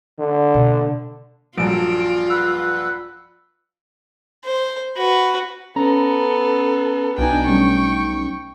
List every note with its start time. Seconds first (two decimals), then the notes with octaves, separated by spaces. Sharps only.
0.19 D3
0.54 B2 A#3
1.58 A#1 G2 F#3 F4 A4 A5 D7
2.30 B4 F#5 E6
4.45 C5
4.97 F#4 B4
5.76 B3 C#4 A4 A#5
7.18 B1 D4 D#4 G5 G#5
7.47 G3 A3 C#4 C#6